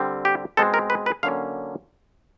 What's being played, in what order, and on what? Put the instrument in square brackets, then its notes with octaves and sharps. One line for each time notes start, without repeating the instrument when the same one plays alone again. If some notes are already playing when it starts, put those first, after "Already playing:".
Already playing: [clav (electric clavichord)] D3 G3 C4
G4
B2 G#3 C4 A4
A#4
B4
B4
D3 F#3 A#3 C#4 F5